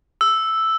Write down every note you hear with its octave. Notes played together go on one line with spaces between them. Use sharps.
E6